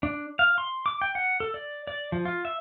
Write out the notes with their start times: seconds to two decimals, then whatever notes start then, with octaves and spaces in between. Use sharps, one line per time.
0.03 D4
0.39 F5
0.58 C6
0.86 D6
1.01 G5
1.15 F#5
1.40 A4
1.54 D5
1.87 D5
2.12 F3
2.25 F4
2.45 E5